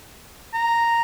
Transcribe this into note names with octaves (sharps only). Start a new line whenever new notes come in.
A#5